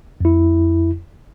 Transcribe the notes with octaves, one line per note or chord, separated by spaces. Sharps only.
F2 E4